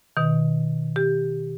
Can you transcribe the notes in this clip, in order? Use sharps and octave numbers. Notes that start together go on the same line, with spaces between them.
B2 D#3
G4